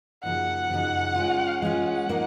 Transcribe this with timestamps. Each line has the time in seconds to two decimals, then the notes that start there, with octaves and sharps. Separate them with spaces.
0.23 F#2 C#3 F3 A#3 D#4 F#5
0.70 F#2 C#3 F3 A#3 D#4
1.16 G#3 C#4 F4
1.62 G#3 C#4 F4 F#5
2.09 F3 A#3 D#4 A#4 D#5